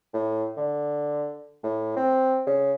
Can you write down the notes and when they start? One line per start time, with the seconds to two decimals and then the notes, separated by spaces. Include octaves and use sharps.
0.14 A2
0.57 D3
1.63 A2
1.97 C4
2.47 C#3